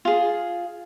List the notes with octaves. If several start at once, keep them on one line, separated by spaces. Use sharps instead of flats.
F4 G#4